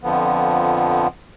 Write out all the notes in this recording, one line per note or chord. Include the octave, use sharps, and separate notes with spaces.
F2 D3 F3 B3